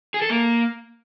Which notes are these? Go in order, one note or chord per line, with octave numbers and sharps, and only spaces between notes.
G#4
A4
A#3